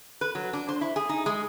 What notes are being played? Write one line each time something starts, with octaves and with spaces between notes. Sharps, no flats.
B4
F#3
D4
C5
E4
G#4
D#4
G#3